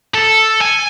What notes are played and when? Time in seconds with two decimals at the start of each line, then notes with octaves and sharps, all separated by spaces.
0.14 A4
0.61 G#5